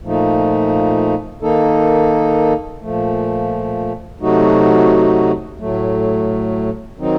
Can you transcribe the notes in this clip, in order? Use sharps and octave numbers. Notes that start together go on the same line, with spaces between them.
A#2 F3 A3 D#4
D#3 A#3 D#4 A4
A#2 F3 A3
C3 F#3 A3 D#4 F#4
A2 F#3 A3
D#3 F#3 C4 D#4